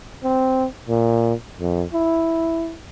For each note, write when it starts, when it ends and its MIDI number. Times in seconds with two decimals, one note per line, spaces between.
0.24 0.66 60
0.88 1.34 46
1.60 1.85 41
1.93 2.76 64